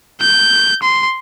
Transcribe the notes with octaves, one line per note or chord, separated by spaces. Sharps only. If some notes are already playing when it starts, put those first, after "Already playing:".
G6
C6